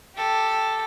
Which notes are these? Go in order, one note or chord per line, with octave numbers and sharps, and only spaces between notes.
G4 A4